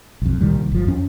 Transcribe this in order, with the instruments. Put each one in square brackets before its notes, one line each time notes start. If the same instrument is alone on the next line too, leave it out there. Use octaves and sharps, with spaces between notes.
[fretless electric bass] B1 F2
C2 A#2 D#3 G3
G1 F3
F2 C#4